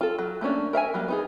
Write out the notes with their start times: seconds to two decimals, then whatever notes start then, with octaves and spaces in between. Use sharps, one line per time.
0.01 F4 A4
0.19 F#3
0.41 A3 A#3 C#4 D4
0.73 A#4 E5 F5 G#5
0.94 F#3 G3 A#3
1.08 B3 D#4 G#4